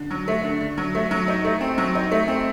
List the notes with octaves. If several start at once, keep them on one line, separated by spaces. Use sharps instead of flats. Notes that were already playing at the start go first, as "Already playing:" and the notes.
Already playing: D3
F#3
A3
D3
D3
F#3
A3
F#3
D#4
A3
C4
F#3
D#4
A3
C4